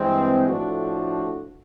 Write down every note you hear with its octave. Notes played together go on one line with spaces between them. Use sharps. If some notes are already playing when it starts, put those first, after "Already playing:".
Already playing: G2 E3 G#3 C4
A2 F3 A3 D4 F#4